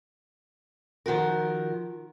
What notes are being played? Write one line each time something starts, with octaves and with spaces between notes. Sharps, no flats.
D#3 F3 F#4 A#4